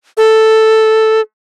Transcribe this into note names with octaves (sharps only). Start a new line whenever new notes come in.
A4